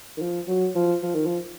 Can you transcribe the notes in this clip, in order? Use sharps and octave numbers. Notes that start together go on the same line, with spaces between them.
D#3
F3
F#3
F3
F3
D#3
F3